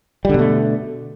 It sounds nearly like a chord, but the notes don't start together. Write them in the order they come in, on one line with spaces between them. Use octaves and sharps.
G3 D3 B2 A3